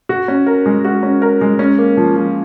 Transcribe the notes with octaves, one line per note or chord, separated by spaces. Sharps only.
F#4
C#4
A#4
G#3
F#4
C#4
A#4
G#3
C#4
A#3
F3
F3